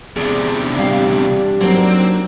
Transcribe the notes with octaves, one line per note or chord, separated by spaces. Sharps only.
E2 C3 D4 G#4
G3 F5
F#3 A#3 C4 D#4